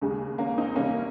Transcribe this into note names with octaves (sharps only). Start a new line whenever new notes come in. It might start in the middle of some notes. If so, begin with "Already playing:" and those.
D#2 C#3 G#3
A#3 C#4
C4 D#4
C2 C3 G3 A#3 C#4